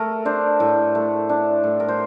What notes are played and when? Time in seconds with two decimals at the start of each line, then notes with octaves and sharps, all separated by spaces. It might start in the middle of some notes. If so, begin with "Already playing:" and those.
Already playing: A3 A#4
0.25 D4 C5
0.60 A2
0.95 A3
1.29 D4
1.64 A2
1.80 A#4
1.89 C5